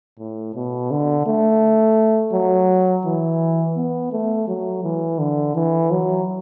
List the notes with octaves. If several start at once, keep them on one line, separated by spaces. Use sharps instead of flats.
A2
B2
D3
A3
F#3
E3
B3
A3
F#3
E3
D3
E3
F#3